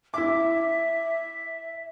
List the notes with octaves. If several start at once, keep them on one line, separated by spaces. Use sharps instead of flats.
E4 E5 D6